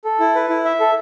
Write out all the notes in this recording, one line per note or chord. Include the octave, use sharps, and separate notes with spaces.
A4
E4
B4
E4
E5
A4